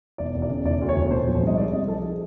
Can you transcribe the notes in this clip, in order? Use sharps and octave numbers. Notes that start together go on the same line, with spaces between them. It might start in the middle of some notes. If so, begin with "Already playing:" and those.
E1 D5
E1
D5
C#3
E1 D5
D2
C#5
E1
A#2 C5
F3
C5
C2 D#5
G#3 D5
C2 D#5
F3 A4
G#4